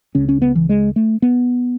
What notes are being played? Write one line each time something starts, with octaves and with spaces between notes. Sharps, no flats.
C#2 C#3 C#4
C#4
B3
E3
G#3
A3
B3